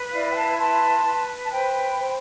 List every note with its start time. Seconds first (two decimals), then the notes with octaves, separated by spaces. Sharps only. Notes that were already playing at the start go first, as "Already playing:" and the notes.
Already playing: B4
0.12 E4 D5 F5
0.32 G5
0.36 F5 A5
0.58 B4 A5 C6
1.04 B4
1.45 A5
1.50 C5 G5 B5
1.97 C5